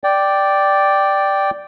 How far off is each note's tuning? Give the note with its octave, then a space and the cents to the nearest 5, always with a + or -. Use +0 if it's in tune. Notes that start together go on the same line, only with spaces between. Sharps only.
D5 +0 G5 -5